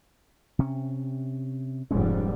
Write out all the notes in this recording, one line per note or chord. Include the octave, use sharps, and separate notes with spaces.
C3 C#4
F1 G#2 G3 G#3 C#4